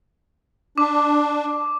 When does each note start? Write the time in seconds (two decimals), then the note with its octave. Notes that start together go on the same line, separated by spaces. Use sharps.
0.78 D4 D6